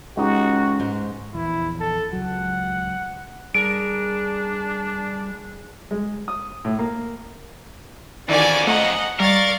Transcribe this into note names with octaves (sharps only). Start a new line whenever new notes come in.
C#2 G#3 D#4 F#4 G4
G#2
A#1 E2 E4
A4
C#2 F#3 F#5
G3 D4 G#4 A#4 D7
G#3
D#6
A2
A#3
F2 D#3 E3 C#4 F#4 D5 G#5 D6
A3 D#5 F#5 A#5
G3 A#4 D5 F5 C#6 A6